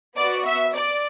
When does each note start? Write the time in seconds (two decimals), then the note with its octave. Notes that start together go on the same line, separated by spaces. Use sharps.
0.16 B3 F#4 D5
0.45 E5
0.74 D5